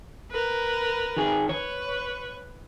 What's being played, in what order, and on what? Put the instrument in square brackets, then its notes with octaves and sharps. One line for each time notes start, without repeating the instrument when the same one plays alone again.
[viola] A#4 B4
[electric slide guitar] D#3 G#4
[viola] B4 [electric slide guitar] C#5